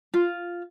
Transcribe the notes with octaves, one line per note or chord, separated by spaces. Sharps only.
F4